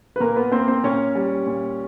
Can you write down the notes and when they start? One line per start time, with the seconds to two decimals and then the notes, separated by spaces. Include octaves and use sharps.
0.16 B4
0.20 A#2 A#3 A#4
0.36 B3 B4
0.52 A#3 C4 C5
0.68 C4 C5
0.84 A#2 C#4 C#5
1.15 G3
1.46 A#2